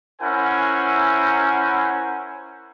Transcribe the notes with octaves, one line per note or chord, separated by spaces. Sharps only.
C#4 E4 A#4 C5 F#5 G#5